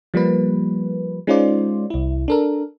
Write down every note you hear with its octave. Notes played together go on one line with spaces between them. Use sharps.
F3 G3 A#3 B4
G#3 C#4 D#4 F4 C5 D5
C2 E4
D4 A4 A#4